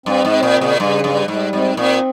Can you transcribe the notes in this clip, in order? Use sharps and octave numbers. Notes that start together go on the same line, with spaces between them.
G2 C4
G#2
C4
A#2
C#3
A#2
G2 C#3
G2 G3
G#2 G3
G#2 C4
A#2 C4